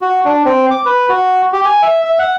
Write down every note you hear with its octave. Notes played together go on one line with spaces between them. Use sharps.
F#4
D4
C4
D6
B4
F#4
G4
G#5
E5
E5
F#5